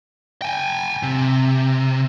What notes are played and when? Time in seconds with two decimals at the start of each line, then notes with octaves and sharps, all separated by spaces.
0.42 G5 G#5
1.03 C3